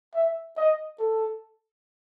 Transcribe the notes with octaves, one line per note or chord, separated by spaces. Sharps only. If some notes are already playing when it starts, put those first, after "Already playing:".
E5
D#5
A4